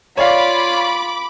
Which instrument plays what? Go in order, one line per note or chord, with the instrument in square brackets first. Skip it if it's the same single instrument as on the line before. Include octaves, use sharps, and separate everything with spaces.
[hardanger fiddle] F4 [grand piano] C#5 D5 F5 [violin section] B5 D6